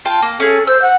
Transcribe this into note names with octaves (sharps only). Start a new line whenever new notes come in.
F4 G5 A5
A#3
C#4 G#4 A4
C5 E6
F#5